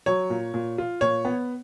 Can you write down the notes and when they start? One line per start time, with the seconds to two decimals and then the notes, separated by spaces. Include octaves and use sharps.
0.06 F#3 C#5
0.30 A#2
0.54 A#2
0.78 F4
1.01 A#2 C#5
1.25 B3